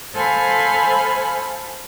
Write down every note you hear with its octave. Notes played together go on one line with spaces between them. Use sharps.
A4 C5 F5 G#5 B5